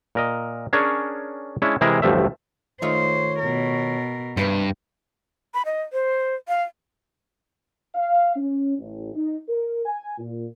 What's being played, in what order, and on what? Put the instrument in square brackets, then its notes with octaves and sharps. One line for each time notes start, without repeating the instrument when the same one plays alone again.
[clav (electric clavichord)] A#2 A#4 D#5
C#4 D4 G#4 A#4 C#5
G#3 C#4 D4 E4
C3 E3 G#3 E4 G#4 A#4
A1 D2 G2 F3 A3 E5
[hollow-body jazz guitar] D#3 A3 F4 [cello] C5 [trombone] C#5
[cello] B2 A#4
[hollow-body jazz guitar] C2 B4 C5 [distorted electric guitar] G2
[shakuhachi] B5
D#5
C5
F5
[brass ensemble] F5
C#4
A1
D#4
A#4
G#5
A#2